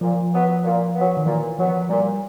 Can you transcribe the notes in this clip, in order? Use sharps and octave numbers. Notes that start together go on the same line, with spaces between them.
A#2 F3
F#3 B3
A#2
F#3 B3
D#3
A#2 E3
F3 F#3 B3
A#2 G3